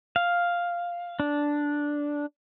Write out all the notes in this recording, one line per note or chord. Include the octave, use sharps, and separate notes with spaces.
F5
D4